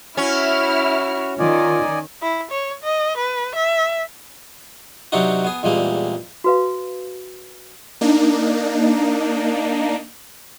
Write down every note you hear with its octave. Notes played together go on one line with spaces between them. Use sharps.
C#4 E4 F#4 F6
D#3 F4 D5 D#5 G#5
E4
C#5
D#5
B4
E5
C3 F#3 C4 D4 D#4 F#4
B3 G#4
E2 A#2 G3 G#3 A#3 C4
F#4 B4 F5
A#3 D4 D#4